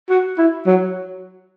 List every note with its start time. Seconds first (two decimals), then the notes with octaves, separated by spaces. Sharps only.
0.10 F#4
0.38 E4
0.66 F#3